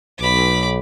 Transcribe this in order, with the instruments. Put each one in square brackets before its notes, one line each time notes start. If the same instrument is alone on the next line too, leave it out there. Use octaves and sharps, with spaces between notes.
[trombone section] B1 [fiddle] B5 D6